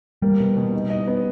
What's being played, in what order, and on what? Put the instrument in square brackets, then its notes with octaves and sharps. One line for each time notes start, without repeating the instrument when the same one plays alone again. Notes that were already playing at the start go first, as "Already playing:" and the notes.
[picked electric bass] G3 [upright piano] A#3
[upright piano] B2
B2
D#4
D#5
B3